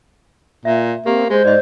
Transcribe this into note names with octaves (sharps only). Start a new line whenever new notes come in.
A#2 E5
A#3 C4 G4
G#3 C5
G#2 D5 D#5